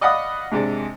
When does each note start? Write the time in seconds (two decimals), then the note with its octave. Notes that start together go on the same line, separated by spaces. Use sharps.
0.01 D5 D#5 F5 F#5 B5 D#6
0.52 G#2 C3 G#3 D4